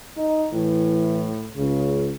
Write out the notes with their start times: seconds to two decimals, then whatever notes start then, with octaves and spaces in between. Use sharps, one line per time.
0.17 D#4
0.53 A2 E3
1.57 C#2 C#3